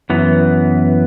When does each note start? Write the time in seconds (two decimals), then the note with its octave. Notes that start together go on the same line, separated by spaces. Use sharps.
0.10 F#2 E3 B3